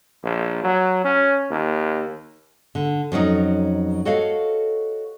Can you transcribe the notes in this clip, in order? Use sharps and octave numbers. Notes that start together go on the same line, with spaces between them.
A#1
F#3
C#4
D#2
D3
F2 F#3 C#4 D#4
F#4 A4 C#5 D#5 F5